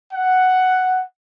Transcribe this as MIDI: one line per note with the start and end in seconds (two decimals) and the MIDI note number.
0.12 1.02 78